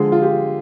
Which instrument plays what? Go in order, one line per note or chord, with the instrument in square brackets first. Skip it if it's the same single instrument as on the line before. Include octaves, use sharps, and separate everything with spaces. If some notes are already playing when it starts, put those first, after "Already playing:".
Already playing: [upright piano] D3 F3 G#3 G#4
F4
G4